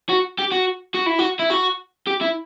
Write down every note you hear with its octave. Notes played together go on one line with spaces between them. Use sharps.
F#4
G4
F#4
F#4
E4
F#4
E4
F#4
G4
E4